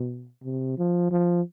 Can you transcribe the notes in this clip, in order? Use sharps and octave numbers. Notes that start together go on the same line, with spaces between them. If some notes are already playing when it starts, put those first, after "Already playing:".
Already playing: B2
C3
F3
F3